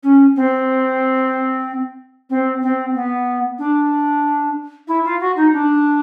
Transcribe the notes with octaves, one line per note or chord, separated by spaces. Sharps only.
C#4
C4
C4
C4
B3
D4
E4
F4
F#4
D#4
D4